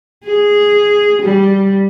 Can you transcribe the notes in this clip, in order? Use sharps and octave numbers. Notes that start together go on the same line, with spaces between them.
G#4
G3